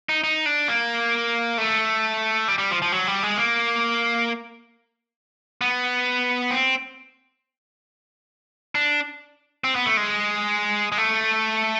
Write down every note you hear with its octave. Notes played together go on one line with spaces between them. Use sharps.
D#4
D#4
D4
A#3
A3
G3
G3
F3
F3
F#3
G3
G#3
A#3
B3
C4
D4
C4
B3
A3
G#3
G#3
A3